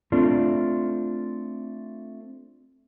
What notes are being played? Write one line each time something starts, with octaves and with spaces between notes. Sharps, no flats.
A3 C4 D4 F4